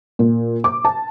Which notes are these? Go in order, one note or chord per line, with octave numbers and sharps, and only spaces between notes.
A#2
D6
A5